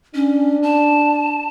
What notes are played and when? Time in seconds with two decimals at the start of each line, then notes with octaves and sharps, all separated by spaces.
0.15 C#4 D4
0.63 A5